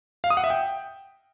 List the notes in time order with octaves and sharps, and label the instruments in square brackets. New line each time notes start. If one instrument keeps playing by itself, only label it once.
[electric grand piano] F5
D#6
F#5
E5
G5